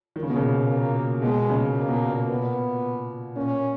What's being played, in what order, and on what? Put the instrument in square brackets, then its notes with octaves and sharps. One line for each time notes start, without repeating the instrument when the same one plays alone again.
[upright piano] D#3
C#3
B2
A#2 C#3
[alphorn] A#3
[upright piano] B2 [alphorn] G#3
[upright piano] A#2 C#3
[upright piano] A#2 [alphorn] A#3
[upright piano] B2
A#2
[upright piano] A#2 [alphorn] B3
[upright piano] A#2 [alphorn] C#4